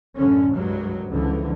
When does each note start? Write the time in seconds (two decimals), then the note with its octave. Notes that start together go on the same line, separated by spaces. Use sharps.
0.15 A1 F#2 D3 C#4
0.54 C2 G2 F#3 G#3
1.08 C#2 D3 E3 F3